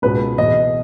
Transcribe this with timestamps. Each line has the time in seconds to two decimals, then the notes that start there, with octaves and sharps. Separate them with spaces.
0.02 C#2 B2 B4
0.38 E2 B2 D#5